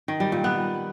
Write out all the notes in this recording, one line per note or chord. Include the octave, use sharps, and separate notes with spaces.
D#3
G3
A#2
B3